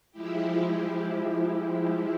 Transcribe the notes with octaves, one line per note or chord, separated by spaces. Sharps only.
F3 G#3 E4 G4